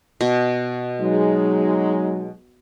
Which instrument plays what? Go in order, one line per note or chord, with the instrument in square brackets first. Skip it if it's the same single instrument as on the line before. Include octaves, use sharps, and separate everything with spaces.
[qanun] B2
[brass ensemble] F#3 G#3 D#4